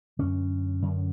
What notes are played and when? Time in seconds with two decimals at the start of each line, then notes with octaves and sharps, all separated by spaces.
0.19 F#2 D3 C#4
0.82 F#2 D3